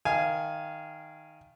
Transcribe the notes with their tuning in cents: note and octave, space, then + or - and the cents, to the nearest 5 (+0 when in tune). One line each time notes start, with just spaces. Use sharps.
D#3 +0 F5 -25 G#5 +0